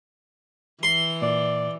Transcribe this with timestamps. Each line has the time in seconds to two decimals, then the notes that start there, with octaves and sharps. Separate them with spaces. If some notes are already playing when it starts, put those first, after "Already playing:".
0.83 E3 C6
1.22 A#2 D5